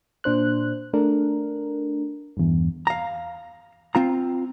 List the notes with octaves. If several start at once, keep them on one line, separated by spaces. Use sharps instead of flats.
A#2 D4 C5 F#6
A3 D4 A#4
E2 G2
F5 A#5
C4 F4 A#5